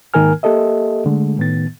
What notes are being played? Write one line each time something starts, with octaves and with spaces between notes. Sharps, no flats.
G#2 D#3 A#3 A#4 G#5 F6
A#3 G4 A4 D#5 E5
D3 G#3 A3
A2 D#3 B3 A6